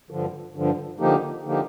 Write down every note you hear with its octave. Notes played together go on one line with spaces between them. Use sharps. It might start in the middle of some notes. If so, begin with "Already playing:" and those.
G2 D3 F3
G2 D3 F3
D3 F3 A#3 D#4 G4
D3 F3 A#3 D#4 G4